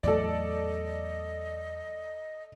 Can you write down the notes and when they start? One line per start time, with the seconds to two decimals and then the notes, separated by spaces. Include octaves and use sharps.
0.03 E2 A2 F#3 A4 D5 D#5